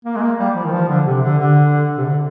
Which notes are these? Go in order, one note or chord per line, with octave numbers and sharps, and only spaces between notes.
A#3
G#3
A#3
G3
F3
D#3
F3
D3
C3
D3
D3
C3
D3